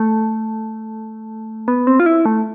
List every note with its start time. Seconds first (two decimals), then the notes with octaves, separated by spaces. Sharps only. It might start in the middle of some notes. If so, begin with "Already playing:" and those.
Already playing: A3
1.68 B3
1.87 C4
2.00 F4
2.06 E4
2.25 A3